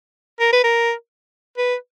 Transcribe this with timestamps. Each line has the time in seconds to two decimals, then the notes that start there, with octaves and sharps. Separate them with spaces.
0.40 A#4
0.53 B4
0.64 A#4
1.58 B4